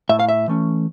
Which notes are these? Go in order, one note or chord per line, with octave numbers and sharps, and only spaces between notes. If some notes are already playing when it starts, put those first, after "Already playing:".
A2 E5
F5
E5
E3 A3 C#4